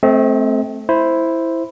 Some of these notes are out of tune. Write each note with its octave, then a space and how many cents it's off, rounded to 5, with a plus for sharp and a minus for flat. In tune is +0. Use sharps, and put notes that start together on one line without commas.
A3 -15 C4 +0 D#5 +40
E4 +0 C5 +0